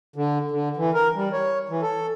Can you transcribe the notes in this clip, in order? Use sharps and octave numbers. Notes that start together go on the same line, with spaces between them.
D3
D3
E3
A#4
G3
C#5
E3
A4